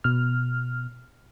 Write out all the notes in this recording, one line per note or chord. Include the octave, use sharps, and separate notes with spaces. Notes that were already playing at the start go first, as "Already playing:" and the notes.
B2 F6